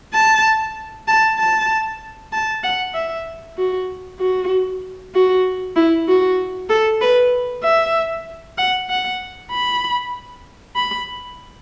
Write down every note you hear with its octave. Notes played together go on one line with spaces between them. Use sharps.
A5
A5
A5
A5
F#5
E5
F#4
F#4
F#4
E4
F#4
A4
B4
E5
F#5
F#5
B5
B5